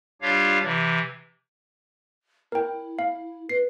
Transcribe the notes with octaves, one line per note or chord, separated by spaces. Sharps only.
G3 D4 F4 G4 C#5 F5
C3 E3
E4 A#4 G5
F5
B4 C7